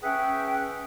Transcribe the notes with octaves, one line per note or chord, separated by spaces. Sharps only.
C#4 G#4 B4 E5 F#5 G5